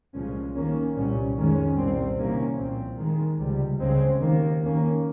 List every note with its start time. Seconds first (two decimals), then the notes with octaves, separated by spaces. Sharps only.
0.14 C2 A#2 F3 G#3 C#4
0.55 D#2 D#3 A#3 C#4
0.96 C2 A#2 G3 C#4
1.36 F2 D#3 G#3 C#4
1.77 C2 A#2 G3 C4
2.18 C2 C3 D#3 A#3 C#4
2.58 C2 A#2 F3 C4
2.98 D#2 D#3 G#3
3.39 C#2 C3 G3
3.80 C#2 C#3 G#3 C4
4.20 D#2 D#3 A#3
4.61 D#2 D#3 A#3 C#4